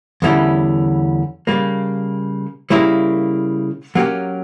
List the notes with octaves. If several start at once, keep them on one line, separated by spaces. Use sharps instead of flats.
E2 D3 G3 C#4 E4
C#3 G3 A#3
C#3 G3 A#3 E4 A#4
F#3 A#3 C#4 G4 A#4